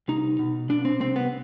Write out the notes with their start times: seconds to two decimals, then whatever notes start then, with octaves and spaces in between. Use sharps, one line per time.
0.08 C2 D#4
0.39 B2
0.69 B2 D4
0.85 C4
1.00 C2 C4
1.16 B3